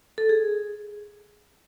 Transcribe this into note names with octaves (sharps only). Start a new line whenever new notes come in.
A4
G#4